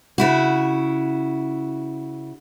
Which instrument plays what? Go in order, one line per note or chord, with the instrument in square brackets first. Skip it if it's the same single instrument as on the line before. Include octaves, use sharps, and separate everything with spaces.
[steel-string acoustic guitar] C#3 E4 F#4